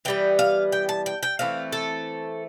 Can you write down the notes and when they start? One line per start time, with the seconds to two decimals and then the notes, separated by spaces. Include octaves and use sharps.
0.05 E3 G3 B3 G5
0.39 F5
0.72 G5
0.89 A5
1.06 G5
1.23 G5
1.39 E3 A3 C4 F5
1.73 A4